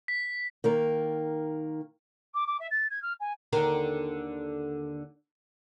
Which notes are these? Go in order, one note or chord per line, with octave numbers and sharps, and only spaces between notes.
B6
D#3 A#3 A#4
D6
D6
E5
A6
G#6
F6
G#5
D#2 D3 A#4